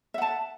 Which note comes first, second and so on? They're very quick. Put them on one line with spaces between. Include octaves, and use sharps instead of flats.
E5 F#5 A5